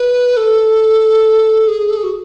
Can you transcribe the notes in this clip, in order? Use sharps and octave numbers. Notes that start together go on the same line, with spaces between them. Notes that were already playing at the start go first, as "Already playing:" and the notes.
Already playing: B4
A4
G#4
A4
G#4
F#4